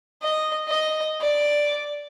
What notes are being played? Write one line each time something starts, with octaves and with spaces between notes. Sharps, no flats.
D#5
D#5
D5